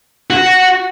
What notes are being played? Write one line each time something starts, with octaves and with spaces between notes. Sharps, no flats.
F#4